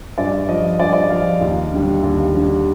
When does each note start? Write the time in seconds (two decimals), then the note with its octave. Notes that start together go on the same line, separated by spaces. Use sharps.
0.18 G2 D5
0.48 F3 D#5
0.79 G2 D5
0.93 D5
1.02 D#5
1.10 F3 F5
1.41 D#2
1.72 D3 G3
2.03 D#2
2.34 D3 G3